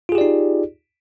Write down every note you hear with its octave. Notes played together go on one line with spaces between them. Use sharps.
D#4 F4 G4 G#4 D5